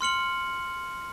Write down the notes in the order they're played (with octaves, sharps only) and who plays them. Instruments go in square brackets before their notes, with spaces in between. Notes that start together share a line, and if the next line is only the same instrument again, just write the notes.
[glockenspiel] C6 F6 C#7 F#7